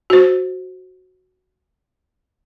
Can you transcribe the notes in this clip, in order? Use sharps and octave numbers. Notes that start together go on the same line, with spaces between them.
F#4 C5